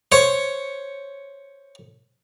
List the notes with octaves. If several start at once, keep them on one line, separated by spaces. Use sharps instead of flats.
C5 C#5